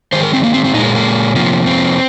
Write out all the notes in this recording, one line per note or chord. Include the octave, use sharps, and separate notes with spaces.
D#3 G#3 C5
A#4
C4
A#3
C4
C4
A#2 G#3 D#4
A#3
A#3
C3 F3 A#3
C4